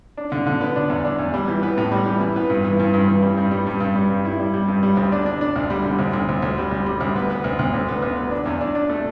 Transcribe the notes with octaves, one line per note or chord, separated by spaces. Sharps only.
D4
D3
D3
B3
D4
E2
D4
E2
G3
E3
B3
A2
G3
E3
E3
B3
G2
E3
G2
G2
E3
G3
G2
G3
G2
G2
G3
G2
E4
G3
G3
G2
G3
D2
D4
D4
D4
D2
G3
D3
D2
D2
D2
D2
G3
D2
G3
D2
B3
B3
D2
D2
D2
B3
D2
B3
D4
E2
D4
D4
A3